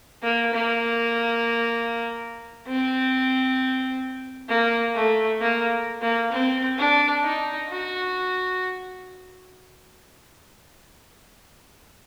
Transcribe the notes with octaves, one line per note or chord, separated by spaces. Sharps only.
A#3
A#3
C4
A#3
A3
A#3
A#3
C4
D4
D#4
F#4